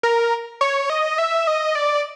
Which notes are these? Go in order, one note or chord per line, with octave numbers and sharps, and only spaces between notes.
A#4
C#5
D#5
E5
D#5
D5